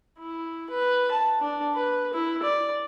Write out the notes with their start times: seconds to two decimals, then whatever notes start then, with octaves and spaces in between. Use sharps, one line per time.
0.19 E4
0.70 B4
1.11 A5
1.40 D4
1.75 B4
2.13 E4
2.43 D5